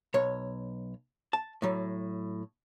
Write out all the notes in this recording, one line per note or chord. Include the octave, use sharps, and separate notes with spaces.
B1 C#5
A5
A2 F#3